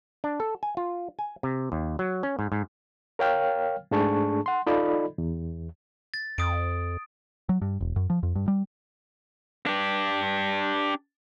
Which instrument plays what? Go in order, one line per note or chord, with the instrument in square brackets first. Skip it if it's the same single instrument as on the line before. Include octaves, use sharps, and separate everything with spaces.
[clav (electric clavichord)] D4
A4
G#5
F4
G#5
C3
D#2
F#3
C#4
G#2
G#2
[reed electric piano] A#4 C#5 F5 G5 F6
G#2 A3 D4 G#4 A5 C#6
F#5 C6
D#4 F4 A4 D5 D#5 B5
E2
[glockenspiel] A6
[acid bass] F2 [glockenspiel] D#6 D7
[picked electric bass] F#3
G2
E1
F#2
F3
F2
G2
G3
[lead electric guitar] D4 G4